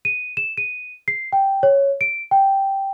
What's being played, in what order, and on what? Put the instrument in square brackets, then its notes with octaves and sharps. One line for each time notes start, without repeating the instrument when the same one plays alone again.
[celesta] D#7
E7
D#7
C7
G5
C#5
D7
G5